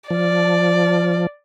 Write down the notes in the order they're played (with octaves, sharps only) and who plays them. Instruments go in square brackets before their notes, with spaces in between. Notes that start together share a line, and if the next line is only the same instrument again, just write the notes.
[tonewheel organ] F3 [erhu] D5